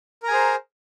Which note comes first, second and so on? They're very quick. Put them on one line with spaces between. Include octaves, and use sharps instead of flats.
A#4 A#5 G#5 G#4 C5